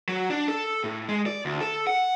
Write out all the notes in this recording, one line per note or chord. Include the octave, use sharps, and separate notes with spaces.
F#3
D4
A4
A2
G#3
D5
D2
A4
F#5